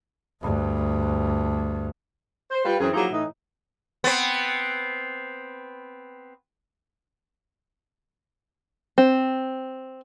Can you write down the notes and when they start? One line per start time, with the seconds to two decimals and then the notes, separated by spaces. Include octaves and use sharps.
0.42 D2 G2
2.51 C5
2.65 G3 F4 B4
2.80 F#2 E3 C4 G#4
2.94 F3 F#3 A#3 D#4 E4 G#4
3.11 A2 E3 D#4
4.04 B3 C4
8.98 C4